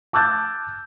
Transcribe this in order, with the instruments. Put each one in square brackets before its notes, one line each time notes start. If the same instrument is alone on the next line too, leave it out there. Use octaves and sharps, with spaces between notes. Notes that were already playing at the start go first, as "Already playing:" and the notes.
[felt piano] A5 D6 E6 F#6 G6 A6